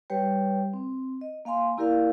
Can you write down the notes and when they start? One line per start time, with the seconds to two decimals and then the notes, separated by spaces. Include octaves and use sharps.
0.10 G3 G4 B4 C#5 G5
0.74 C4
1.21 D#5
1.45 A#3 F5 G#5 C6
1.77 A#3 E4 G4 A#4 D5 F5